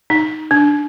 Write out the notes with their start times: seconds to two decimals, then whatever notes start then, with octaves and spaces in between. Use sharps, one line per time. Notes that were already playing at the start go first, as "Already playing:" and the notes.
0.10 D#4
0.51 D4